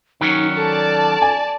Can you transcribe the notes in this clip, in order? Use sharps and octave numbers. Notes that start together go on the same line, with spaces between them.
D#3 F#3 C#4 D#4
A4 D5 A5
G#5